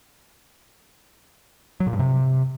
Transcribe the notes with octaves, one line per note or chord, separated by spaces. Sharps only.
F#3
A#2
G2
C3